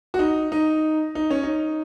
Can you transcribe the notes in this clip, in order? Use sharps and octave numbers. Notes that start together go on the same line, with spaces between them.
F#4
D#4
D#4
D#4
C#4
D#4